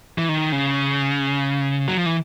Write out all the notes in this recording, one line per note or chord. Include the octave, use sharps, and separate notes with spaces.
E3
D#3
C#3
F#3
F3
E3